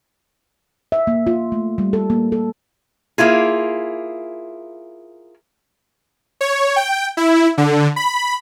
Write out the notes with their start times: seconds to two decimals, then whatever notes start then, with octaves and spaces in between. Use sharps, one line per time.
0.92 E5
1.07 A#3
1.27 F4
1.52 A3
1.78 G3
1.93 A4
2.10 A#3
2.32 A4
3.18 A#3 E4 F4 G#4
6.41 C#5
6.76 G5
7.17 E4
7.58 D3
7.96 B5